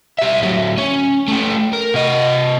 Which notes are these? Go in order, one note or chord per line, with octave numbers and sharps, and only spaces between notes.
G3 E5
D2 F#3
C#4
A3 G4
A#4
C3 D#5